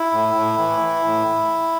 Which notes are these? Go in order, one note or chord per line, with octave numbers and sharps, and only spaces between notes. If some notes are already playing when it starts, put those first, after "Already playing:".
Already playing: E4
A2
A2
E3
E3
A2